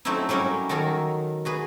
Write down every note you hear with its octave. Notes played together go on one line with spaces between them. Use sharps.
F#3 A3 C4 C#4 D#4 E4
F#3 G3 C#4 A#4 C#5
D#3 F#3 F#4 A4 A#4 C#5
F#4 G#4 B4